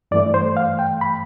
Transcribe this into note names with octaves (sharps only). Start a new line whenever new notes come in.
G2 E3 A3 D5
C5
F5
G5
B5